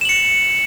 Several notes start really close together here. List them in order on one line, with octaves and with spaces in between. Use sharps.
E7 F#7 C#7